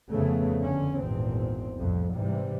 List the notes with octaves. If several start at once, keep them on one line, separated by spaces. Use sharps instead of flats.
F2 C#3 A3 B3
F#1 D3 C#4
G#1 E2 A#2 C4
C2 F2 A2
G#2 C3 E3 G3